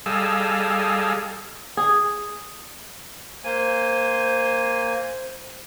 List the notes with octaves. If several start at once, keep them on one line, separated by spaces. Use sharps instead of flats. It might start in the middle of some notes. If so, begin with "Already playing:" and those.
G3 G#4 A4 D#5 F5 E6
G#4
A#3 C5 G#5